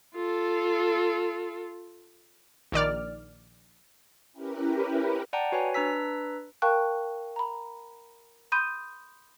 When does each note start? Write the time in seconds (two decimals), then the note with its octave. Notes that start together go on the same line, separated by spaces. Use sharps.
0.15 F4 A4
2.72 A#1 D#3 D5 F6
4.32 C#4 E4 G4 A#4 B4
5.33 D5 F#5 G5 A5 A#5
5.52 F#4 B4 C#5 G#5
5.74 D4 B4 A#5 E6 B6
6.62 A#4 F5 G5 A5 C#6 F#6
7.36 A#5 B5
8.52 B5 C6 D#6 G6 D#7